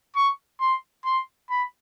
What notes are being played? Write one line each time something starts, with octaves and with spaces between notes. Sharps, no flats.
C#6
C6
C6
B5